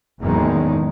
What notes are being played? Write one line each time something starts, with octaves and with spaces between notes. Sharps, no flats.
F#1 E2 A2 D#3 G#3